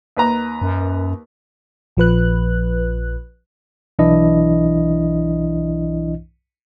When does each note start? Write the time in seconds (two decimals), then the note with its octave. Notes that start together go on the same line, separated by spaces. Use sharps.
0.17 D#2 B4 A#5
0.62 F#2
1.97 A#1 F3 B4 F#6
3.99 B1 E3 D4 E4 D#5